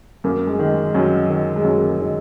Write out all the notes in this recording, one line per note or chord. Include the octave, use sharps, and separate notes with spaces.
F#2 A#3
G#3
D#3
G#3
F#2 F#3
D#3
G#3
F#2 F#3
A#3
G#3
D#3